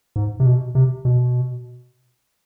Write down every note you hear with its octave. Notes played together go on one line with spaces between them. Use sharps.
G#2
C3
B2
C3
B2